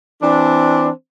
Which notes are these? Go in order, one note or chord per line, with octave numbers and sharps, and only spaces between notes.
E3 C4 D4